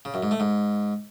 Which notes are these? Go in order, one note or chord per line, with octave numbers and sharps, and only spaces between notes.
C#3
F#2
G#2
A3
G#2